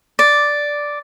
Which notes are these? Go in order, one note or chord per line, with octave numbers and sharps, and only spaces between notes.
D5